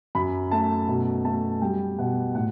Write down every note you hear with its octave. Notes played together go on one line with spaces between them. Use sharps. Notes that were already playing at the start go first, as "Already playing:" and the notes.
F#2 B5
A3 A5
B2
A3 A5
G3 G5
B2 F#5
A2 F#5